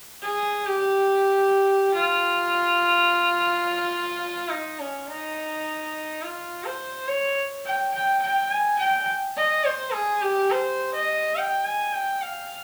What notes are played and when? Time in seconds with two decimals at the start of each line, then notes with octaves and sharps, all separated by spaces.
0.22 G#4
0.65 G4
1.94 F4
4.51 D#4
4.79 C#4
5.08 D#4
6.22 F4
6.65 C5
7.08 C#5
7.65 G5
7.94 G5
8.21 G5
8.50 G#5
8.78 G5
9.37 D#5
9.65 C5
9.93 G#4
10.21 G4
10.50 C5
10.94 D#5
11.36 G5
11.65 G#5
11.93 G5
12.21 F5